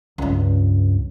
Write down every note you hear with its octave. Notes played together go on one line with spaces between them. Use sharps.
C#2 G2